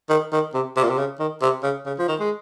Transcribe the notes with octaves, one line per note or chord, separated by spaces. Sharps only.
D#3
D#3
C3
C3
A#2
C3
C#3
D#3
C3
C#3
C#3
F3
D#3
G#3